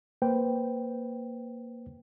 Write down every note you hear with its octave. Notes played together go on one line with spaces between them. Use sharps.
A#3 B4 C5 G5